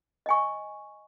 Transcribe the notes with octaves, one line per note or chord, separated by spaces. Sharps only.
D#5 G#5 C#6